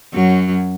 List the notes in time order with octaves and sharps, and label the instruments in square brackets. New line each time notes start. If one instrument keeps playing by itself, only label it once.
[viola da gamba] F#2 F#3